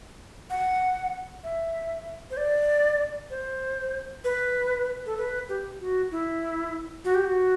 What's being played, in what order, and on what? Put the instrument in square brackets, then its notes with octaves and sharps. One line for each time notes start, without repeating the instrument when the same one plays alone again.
[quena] F#5
E5
C5
D5
C5
B4
A4
B4
G4
F#4
E4
F#4
G4
F#4